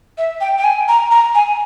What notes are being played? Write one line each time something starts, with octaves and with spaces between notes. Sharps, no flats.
E5
G5
G5
G#5
A#5
A#5
G#5